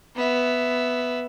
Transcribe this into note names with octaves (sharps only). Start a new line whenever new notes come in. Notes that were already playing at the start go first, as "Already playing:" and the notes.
B3 E5